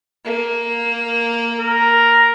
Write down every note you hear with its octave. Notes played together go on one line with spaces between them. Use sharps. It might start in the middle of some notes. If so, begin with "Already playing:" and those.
A#3
A#4